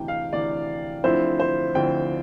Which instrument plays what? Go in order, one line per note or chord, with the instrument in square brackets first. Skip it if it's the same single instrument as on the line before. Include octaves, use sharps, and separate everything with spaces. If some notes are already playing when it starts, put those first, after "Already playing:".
Already playing: [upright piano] D2 C3 E3 G5
F5
D2 C3 E3 D5
D2 D3 F3 C4 E4 C5
C5
D2 D3 F3 C4 E4 G5